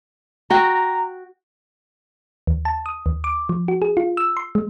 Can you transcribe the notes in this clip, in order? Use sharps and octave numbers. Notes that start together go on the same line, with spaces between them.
F#4 G5 A#5
D#2
A5
D#6
D#2
D6
F3
F#4
G#4
F4
E6
C6
G#3